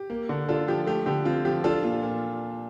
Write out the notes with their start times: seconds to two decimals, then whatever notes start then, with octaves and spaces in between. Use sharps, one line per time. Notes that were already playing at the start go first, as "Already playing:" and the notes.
Already playing: G4
0.10 A#3
0.29 D3
0.49 D4 F4 A4
0.68 F3 G4
0.87 A3 G4
1.06 D3 G4
1.25 C4 F4
1.45 F3 G4
1.64 D4 F4 A4
1.83 A#2 F4
2.02 A#2